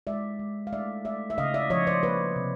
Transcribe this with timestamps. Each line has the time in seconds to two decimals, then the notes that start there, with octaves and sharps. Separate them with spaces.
0.07 G#3 D5 E5
0.39 G#3
0.67 F5
0.72 A3 D5 E5
1.05 A3 D5 E5
1.30 E5
1.38 C#3 D#5 F5
1.54 D5 E5
1.70 F3 C#5 D#5
1.87 C5 D5
2.03 A#3 B4 C#5
2.36 C3